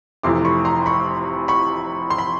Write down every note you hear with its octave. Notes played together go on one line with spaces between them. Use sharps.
F1 F2 C3 E3 A3 C6 D6
B5 C#6
A#5 C6
B5 C#6
B5 C#6
C6
B5